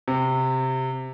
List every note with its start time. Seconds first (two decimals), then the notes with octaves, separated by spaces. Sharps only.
0.08 C3